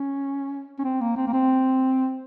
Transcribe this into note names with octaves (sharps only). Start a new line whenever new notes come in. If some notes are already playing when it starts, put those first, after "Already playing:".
Already playing: C#4
C#4
C4
A#3
C4
A#3
C4